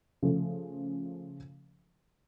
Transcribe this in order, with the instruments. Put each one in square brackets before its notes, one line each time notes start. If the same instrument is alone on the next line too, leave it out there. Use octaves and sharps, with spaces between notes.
[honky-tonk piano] C#3 F3 A3